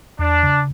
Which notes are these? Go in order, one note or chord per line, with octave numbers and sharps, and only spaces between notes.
E2 D4
C#3